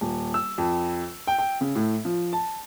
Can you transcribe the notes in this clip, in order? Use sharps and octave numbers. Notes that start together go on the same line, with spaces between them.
D#1
E6
F2
G5
G5
C#3
A2
F3
A5